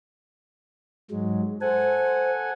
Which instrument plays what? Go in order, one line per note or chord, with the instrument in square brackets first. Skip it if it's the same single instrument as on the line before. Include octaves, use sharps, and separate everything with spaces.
[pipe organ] G#2 F#3 G#3
[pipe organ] A4 F#5 G#5 [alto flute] C5